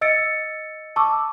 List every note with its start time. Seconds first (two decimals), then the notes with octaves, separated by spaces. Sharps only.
0.01 D#5 E6 A6 C#7 D7
0.96 A5 C#6 D6 E6